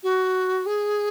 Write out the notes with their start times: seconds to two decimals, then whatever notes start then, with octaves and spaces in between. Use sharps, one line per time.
0.03 F#4
0.66 G#4